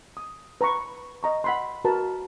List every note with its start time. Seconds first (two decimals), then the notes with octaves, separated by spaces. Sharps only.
0.17 D#6
0.61 B4 A#5 B5 C#6
1.23 D#5 A#5 C#6
1.44 F#5 B5 C6
1.85 F#4 A#4 B4 A5